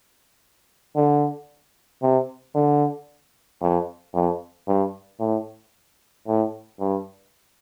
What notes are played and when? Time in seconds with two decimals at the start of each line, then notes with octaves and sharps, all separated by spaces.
0.96 D3
2.02 C3
2.55 D3
3.62 F2
4.14 F2
4.68 G2
5.20 A2
6.27 A2
6.80 G2